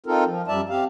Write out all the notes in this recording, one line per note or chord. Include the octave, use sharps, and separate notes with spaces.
C4 D#4 F4 A4 A#4
F3
F#2 G3 D5 E5 A5
C4 G4 F5